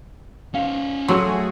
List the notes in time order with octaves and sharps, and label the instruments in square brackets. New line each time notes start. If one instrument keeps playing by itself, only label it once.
[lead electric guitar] C#4 C5 [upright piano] F5
[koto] F#3 [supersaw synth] A3 F#4 G#4 [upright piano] C6 E6 C#7